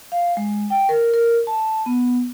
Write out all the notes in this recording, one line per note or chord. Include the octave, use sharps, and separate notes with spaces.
F5
G#3
G5
A#4
A#4
A5
B3